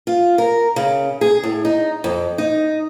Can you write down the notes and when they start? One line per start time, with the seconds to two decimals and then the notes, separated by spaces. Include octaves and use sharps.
0.07 F4
0.38 A#4
0.76 C#3
1.21 G#4
1.43 A2
1.65 D#4
2.04 F2
2.38 D#4